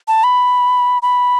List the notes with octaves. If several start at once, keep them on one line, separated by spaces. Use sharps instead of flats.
A5
B5
B5